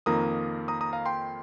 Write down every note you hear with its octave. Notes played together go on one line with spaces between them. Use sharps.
F2 D#3 A#3 A#5 D#6
A#5 D#6
A#5 D#6
F5 A#5
G5 C6